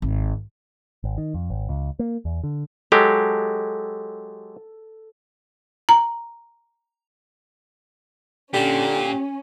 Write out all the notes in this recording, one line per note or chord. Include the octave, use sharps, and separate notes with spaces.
G#1
G#1
D#3
F2
G#1
C#2
A#3
E2
D3
F#3 G#3 G4 A4
A#5
A#2 D3 C#4 G4